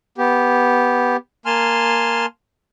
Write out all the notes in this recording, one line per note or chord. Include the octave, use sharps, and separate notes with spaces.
B3 G4
A#3 G#5 A5 C6 F6